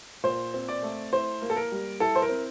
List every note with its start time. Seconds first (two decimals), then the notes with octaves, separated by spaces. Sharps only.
0.23 A#2 C5
0.54 C4
0.68 D5
0.83 A3
1.12 E4 C5
1.42 A#3
1.50 A4
1.56 A#4
1.72 G3
2.00 E4 A4
2.15 C5
2.22 A#4
2.29 C4